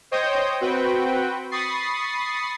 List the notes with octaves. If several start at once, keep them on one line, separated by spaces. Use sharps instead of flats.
C5 C#5 D#5 G5 D#6 G6
C4 F#4 B4 G5
B5 C#6 D#6 A6 C7